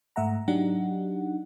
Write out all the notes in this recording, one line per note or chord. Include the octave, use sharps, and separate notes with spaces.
G#2 A3 E5 F#5 A#5
F#3 D4 D#4 G4 F#5